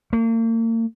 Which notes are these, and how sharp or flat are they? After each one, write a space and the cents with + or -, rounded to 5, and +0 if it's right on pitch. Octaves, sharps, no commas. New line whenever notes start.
A#3 -40